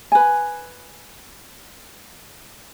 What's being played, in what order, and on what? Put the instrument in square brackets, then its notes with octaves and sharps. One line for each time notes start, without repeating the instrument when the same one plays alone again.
[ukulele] B4 G#5